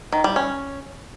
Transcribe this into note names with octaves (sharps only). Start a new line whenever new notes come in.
D#3
G3
C#4